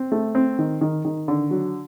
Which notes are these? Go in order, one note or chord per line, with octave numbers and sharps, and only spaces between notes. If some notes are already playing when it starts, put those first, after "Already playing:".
Already playing: C4
A3
C4
D#3
D#3
D#3
D3
F#3